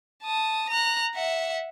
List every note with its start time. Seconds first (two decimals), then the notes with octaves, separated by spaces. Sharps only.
0.24 A5 D#6
0.70 A#5 F#6
1.15 E5 F#5